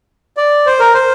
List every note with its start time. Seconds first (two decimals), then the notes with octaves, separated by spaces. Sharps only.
0.37 D5
0.66 C5
0.80 A#4
0.94 C5